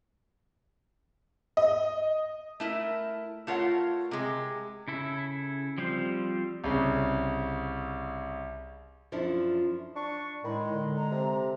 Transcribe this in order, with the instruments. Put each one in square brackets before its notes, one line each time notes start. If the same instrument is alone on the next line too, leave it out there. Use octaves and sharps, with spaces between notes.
[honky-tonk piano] D#5
[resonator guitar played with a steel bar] A3 E4 A#4
A3 F4 A#4 C#5 F#5
C3 G#3
[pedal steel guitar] C#3 E4 A4
F3 G3 C4 C5
[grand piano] C2 C#3
[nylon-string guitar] F#2 F3 D4 E4 A4
[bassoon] D4 [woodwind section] C#6
[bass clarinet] A2 [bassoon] D#3 [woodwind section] G#3 [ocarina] B5
[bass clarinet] D3 [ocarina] D5
[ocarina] A#5
[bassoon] C3